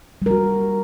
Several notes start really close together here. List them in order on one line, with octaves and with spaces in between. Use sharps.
G3 A#4 F#4